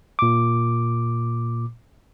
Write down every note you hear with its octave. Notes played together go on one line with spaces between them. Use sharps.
A#2 D6